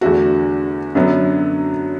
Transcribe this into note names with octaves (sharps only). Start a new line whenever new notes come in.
E2 D3 A3 F#4 A4
F#2 D3 F#3 B3